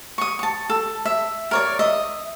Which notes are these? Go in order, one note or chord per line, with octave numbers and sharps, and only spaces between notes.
C#6 D#6
A5 C#6
A4
E5
A#4 C#5 D5
D#5 E5